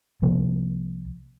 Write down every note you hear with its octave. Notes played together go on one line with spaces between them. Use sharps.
C2 C3 F3 A#3